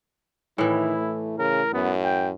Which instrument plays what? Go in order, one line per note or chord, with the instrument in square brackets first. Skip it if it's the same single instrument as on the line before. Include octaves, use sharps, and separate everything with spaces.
[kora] A2 E3 [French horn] D#3 [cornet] E4
[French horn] A3
[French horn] C#3 [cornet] A#4
[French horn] F#2 [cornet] B3
[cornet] G5